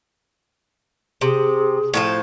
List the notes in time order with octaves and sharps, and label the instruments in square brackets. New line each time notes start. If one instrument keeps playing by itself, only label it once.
[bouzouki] C3 [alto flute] G#4
[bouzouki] A2 F3 A4